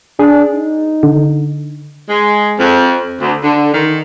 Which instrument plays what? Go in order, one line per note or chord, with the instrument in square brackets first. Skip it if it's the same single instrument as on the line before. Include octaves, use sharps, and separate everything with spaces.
[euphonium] D4 [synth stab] G#4
[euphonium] D#4
[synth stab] D3
[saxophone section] G#3
F2
D2
D3
D#3